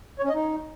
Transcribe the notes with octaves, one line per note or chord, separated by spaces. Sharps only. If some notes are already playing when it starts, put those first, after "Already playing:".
C#5
C#4
D#5
D#4